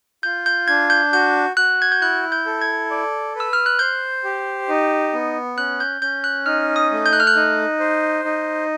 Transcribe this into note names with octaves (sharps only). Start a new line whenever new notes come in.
F4 G6
G6
D4 G#6
G6
F#4 G6
F#4 F#6
G#6
G6
E4 F#6
G6
A4
G#6
D5
B4 E6
F6
F#6
C5 G6
G4
D#4
B3
C#4 F#6
G6
C#4 G6
F#6
D#4 F6
D#6
A3
G6
F#6
F6
F#6
D#4
C5
D#4